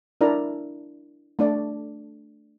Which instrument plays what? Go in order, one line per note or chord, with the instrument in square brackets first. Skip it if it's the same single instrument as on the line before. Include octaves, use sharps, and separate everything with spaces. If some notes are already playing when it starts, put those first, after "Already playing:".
[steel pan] D4 E4 A#4 D5 A#5
A3 D4 D5